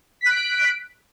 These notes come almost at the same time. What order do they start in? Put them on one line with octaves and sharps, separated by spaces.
B6 F#6 D7